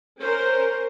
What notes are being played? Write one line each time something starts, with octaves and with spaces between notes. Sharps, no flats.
C#4 A#4 C5 G6